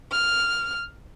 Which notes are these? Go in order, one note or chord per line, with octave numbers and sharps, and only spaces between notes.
F6